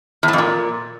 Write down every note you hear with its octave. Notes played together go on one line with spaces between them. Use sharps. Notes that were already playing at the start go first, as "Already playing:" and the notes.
E2
A2
F2
A#2